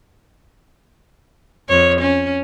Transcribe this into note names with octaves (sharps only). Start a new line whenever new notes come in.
F2 C#5
C#4